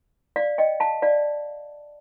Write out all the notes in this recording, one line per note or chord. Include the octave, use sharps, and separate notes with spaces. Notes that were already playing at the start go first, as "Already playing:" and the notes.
D5 F5
D#5 G5
F5 A5
D5 F5